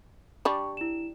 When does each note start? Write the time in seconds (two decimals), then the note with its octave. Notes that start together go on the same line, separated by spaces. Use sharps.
0.45 G3 D4 C#6
0.77 E4 E7